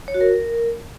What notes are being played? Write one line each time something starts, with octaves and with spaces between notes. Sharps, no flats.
C#5
F#4
A#4